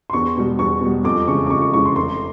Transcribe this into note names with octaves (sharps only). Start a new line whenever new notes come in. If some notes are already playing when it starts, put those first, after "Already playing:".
C6
E2 C#6
B2 G3
E2 C#6
B2 G3
F2 D6
C#3 E3 G#3 C#6
D6
F2 C#6
C#6
C#3 E3 G#3 C#6
C6
F1 C6